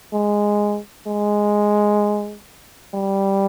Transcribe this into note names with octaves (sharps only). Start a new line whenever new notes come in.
G#3
G#3
G3